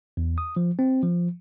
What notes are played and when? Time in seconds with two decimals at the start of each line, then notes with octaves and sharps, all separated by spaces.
0.17 E2
0.38 D#6
0.56 F3
0.79 C4
1.03 F3